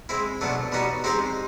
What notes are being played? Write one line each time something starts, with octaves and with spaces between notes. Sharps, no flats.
G#3 C4 E4
B2 F#3 A3 D4
G3 B3 D#4 F#4
G#3 C4 D#4 G4 C5